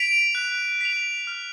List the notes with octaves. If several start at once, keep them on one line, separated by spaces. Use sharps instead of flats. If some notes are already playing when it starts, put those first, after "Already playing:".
Already playing: B6 D7 F7
F#6
B6 F7
F6